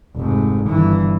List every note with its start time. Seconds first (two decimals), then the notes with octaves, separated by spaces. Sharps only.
0.16 F1 G#2
0.66 G1 E3